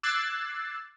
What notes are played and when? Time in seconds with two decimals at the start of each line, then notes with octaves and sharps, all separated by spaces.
0.03 D6 E6 F#6 G#6 A6 C7